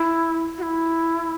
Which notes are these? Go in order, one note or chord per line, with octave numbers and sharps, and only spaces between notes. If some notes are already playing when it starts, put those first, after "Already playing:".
Already playing: E4
F#4
E4